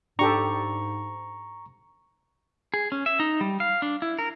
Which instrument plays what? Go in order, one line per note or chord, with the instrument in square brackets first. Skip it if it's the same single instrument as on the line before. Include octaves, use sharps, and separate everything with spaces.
[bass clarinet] G#2 [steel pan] D4 G4 A4 [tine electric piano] A#5 C#6
[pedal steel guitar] G#4
C#4
E5
D#4
G3
F5
D4
E4
A#4